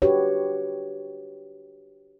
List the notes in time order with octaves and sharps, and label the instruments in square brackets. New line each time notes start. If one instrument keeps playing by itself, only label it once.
[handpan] D4 F#4 G4 B4 C#5